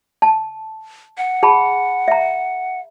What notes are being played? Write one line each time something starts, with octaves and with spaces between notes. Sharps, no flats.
A5
F#5
G#4 A5 B5
E5 A#5